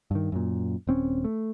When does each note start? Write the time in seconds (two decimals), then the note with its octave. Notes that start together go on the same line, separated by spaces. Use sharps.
0.11 G2 D#3
0.32 F#2 A#2
0.87 D#1 C4 C#4
1.24 A3